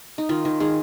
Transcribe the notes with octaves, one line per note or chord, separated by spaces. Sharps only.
D#4
D#3 F4
D#3
D#3 G#4